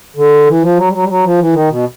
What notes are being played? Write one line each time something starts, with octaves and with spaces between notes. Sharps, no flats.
D3
E3
F3
F#3
G3
F#3
G3
F#3
F3
E3
D#3
B2